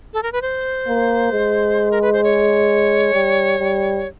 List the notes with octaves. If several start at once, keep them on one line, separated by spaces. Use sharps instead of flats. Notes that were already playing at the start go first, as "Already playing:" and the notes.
A4
A#4
B4
C5
A#3
G#3
A#4
B4
C5
C#5
G3
G3